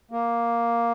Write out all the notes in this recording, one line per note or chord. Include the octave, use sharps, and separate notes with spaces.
A#3